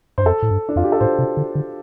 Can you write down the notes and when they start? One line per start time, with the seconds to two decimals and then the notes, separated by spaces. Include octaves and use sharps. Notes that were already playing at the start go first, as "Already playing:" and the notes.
0.18 G2 C5
0.25 F2 A4
0.42 A2
0.51 G2
0.69 D4
0.76 F2 F4
0.84 G4
0.92 A4
1.01 A2 C5
1.19 C3
1.37 D3
1.55 D3